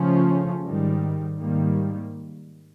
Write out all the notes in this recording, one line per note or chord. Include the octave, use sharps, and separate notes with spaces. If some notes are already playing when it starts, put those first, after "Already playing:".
Already playing: C#3 F3 A3 C#4
G#2 D#3 G3
G#2 D#3 G3 A#3